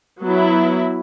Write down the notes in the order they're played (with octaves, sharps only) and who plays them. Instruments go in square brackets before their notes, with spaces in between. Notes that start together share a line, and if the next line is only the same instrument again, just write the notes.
[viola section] F#3 B3 E4